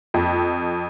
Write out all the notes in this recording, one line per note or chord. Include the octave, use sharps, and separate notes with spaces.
F2